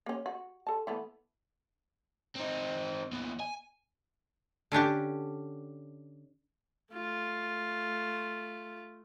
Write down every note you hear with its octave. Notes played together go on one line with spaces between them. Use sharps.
A#3 C#4
F#4
A4 A5
E3 A3 B3
C4 D#4
D#2 B3
G#5
D3 C#4 D4 G4
A3 F4